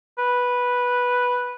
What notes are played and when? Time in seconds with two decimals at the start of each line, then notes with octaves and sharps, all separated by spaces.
0.18 B4